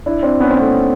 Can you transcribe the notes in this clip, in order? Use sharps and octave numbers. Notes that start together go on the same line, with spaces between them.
D4 E4
C4 D4
B3 C#4
C4
A3 B3